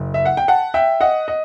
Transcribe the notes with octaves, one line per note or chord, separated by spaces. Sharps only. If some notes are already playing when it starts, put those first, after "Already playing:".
Already playing: F#1
E5
F#5
G5
F#5 A5
E5 G5
D#5 F#5
D#5